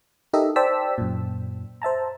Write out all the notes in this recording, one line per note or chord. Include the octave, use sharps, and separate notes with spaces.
D#4 G4 A4 A#4 D#5 E5
C5 D5 G5 A5 E6 B6
F#2 A#2
C5 E5 A5 A#5